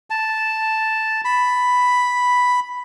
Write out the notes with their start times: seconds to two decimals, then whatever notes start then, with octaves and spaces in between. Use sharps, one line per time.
0.10 A5
1.25 B5